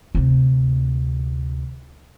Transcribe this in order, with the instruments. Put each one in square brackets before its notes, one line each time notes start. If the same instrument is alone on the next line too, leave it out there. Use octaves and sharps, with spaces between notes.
[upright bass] D2 C3